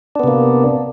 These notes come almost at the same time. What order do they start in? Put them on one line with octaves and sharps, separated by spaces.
D4 B3 C3 A#3